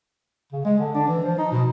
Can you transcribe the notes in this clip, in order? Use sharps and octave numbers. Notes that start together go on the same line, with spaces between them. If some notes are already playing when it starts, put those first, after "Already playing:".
C#3
G#3
D3
D4
E3
F3
D#4
B2